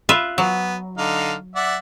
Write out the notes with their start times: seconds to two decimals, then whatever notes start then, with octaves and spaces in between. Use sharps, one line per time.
0.09 F4 B4 E5
0.38 F#3 B3
0.98 D3 D#4 F5
1.56 D5 E5 F#5